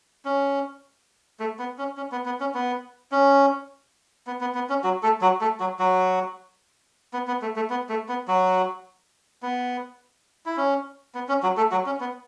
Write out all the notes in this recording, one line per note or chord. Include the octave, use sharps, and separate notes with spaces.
C#4
A3
B3
C#4
C#4
B3
B3
C#4
B3
C#4
B3
B3
B3
C#4
F#3 F#4
A3 A4
F#3 F#4
A3 A4
F#3 F#4
F#3 F#4
B3
B3
A3
A3
B3
A3
B3
F#3 F#4
B3
E4
C#4
B3
C#4
F#3 F#4
A3 A4
F#3 F#4
C#4
B3